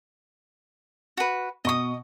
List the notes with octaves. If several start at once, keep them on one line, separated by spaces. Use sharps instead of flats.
F#4 B4
B2 D#5 C#6 D#6